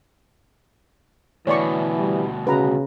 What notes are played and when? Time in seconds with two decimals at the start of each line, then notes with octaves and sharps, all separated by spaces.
1.47 D2 B2 E3 C#5 D5 C#6
1.98 G3
2.47 C#3 F#4 B4 A#5